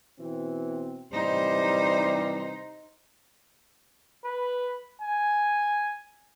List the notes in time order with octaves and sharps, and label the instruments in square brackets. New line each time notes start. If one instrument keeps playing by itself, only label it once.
[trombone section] B2 E3 C4
[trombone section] C3 E3 G3 [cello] D#4 C5
[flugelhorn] B4
G#5